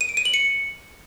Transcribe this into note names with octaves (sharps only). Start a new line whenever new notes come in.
D#7
D7
D#7
F#7
C#7